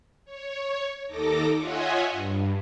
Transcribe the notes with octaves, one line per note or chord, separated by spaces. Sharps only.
C#5
D#2 D#4 A4 D6 A#6
F4 C#5 D#5 E5 F#5 G#5
G2